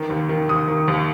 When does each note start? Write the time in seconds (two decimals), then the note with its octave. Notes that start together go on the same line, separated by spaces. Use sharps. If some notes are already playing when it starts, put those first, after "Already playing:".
Already playing: D#3
0.10 D#2
0.29 D#3
0.49 D#2 D#6
0.68 D#3
0.88 D#2